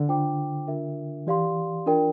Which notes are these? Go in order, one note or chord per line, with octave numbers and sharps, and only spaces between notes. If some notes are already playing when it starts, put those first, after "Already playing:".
Already playing: D3
D4 F4 C5 G5 D6
D4 F4 A#4 E5
E3 G4 D5 F5 C6
D4 F4 A#4 D5 G5